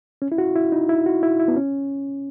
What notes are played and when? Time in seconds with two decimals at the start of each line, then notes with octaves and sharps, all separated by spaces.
0.22 C#4
0.32 E4
0.38 F#4
0.56 E4
0.72 D#4
0.89 E4
1.06 F#4
1.23 E4
1.39 E4
1.48 B3
1.56 C#4